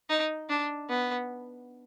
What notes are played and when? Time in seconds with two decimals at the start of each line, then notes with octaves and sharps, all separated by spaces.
0.09 D#4
0.49 D4
0.89 B3